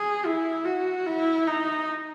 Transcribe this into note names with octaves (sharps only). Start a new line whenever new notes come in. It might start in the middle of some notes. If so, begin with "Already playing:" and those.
Already playing: G#4
E4
F#4
E4
D#4